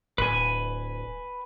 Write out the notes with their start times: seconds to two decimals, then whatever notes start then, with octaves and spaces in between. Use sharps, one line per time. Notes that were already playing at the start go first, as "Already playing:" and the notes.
0.18 D1 B4 G#5